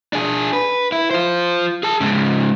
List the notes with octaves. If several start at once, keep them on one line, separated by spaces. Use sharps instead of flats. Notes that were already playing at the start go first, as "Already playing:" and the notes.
D4 G#4
B4
E4
F4 C5
G#4 A5
G#2 C#3